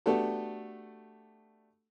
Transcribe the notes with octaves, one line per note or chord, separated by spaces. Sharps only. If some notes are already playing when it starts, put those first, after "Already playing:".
A3 B3 D4 F#4 G4 A4